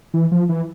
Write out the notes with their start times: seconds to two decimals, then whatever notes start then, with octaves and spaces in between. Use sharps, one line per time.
0.14 E3
0.32 F3
0.49 E3